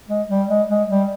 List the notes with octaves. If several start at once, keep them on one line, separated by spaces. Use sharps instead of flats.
G#3
G3
G#3
G#3
G3